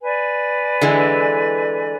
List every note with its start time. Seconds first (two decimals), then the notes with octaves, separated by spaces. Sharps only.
0.02 B4 D5 G#5
0.81 D3 E3 G#3